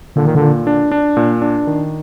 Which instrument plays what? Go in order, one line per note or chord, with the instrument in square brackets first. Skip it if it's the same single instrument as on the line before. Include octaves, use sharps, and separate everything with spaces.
[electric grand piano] A#2 [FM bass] D3
[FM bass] D#3
D3
[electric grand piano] A#2
D4
D4
A#2
D4
D#3